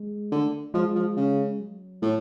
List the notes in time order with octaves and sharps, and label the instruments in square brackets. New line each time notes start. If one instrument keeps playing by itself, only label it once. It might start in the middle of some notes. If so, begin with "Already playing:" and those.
Already playing: [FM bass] G#3
[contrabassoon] D3 [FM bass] A3
[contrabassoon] F3 [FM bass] G#3
[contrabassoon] F3
C#3
[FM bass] F#3
[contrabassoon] A2